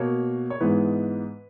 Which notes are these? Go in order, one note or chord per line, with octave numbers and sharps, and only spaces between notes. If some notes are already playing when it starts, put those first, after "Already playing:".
Already playing: B2 A#3 C#5
C#5
G#2 E3 G#3 B3 B4